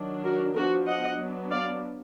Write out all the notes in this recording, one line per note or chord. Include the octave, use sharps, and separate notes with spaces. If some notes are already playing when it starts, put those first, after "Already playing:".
Already playing: D#3 F#3 D4
F#4 A#4
F3 B3 D4 F#4 A#4
D#5 F#5
F#3 B3 D4
D5 F5